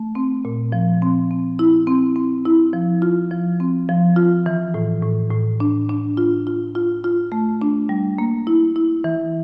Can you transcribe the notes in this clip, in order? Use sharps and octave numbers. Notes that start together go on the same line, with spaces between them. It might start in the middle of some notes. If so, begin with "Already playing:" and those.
Already playing: A3
C4
A#2
F3
C4
C4
E4
C4
C4
E4
F3
F4
F3
C4
F3
F4
E3
A2
A2
A2
D4
D4
F4
F4
F4
F4
A3
D4
G3
A#3
E4
E4
E3